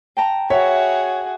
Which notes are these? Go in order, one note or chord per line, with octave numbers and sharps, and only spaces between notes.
G5 A5 A#5
F#4 G#4 C#5 E5